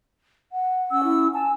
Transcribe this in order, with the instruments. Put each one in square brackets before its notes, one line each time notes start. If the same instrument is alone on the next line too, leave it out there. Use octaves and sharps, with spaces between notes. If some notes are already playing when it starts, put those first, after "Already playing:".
[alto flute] F#5
[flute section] C#4 E6
[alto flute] E4
[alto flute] G#5 [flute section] A5